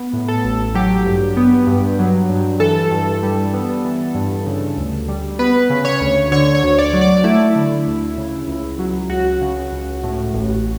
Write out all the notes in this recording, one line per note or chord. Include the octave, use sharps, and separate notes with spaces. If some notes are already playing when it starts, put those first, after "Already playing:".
Already playing: B3
A2
A4
A1
F#3 G4
G2
B3
G2
F#3
G2
E3 A4
G2
G3
B3
E3
G2
C#3
D2
G3
B3 B4
C#3
C#5
D2
D3 C#5
C#5
D2
D5
F#3
D5
A3 E4
D3
D2
C#3
C#2
F#3
C#2 F#4
C#3
C#2
A2
A1